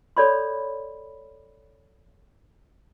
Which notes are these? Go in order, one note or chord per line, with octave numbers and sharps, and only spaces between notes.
A4 C#5 D5 B5 C6